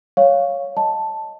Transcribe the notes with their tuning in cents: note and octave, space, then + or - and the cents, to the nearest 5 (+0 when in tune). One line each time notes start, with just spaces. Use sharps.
C#5 +0 F5 +0 C#6 +0
D#5 +0 A5 +0